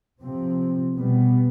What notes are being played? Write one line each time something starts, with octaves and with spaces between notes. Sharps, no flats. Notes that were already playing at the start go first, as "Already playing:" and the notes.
C3 F3 C4
B2 G3 B3